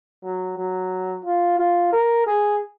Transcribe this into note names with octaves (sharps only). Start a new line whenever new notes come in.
F#3
F#3
F4
F4
A#4
G#4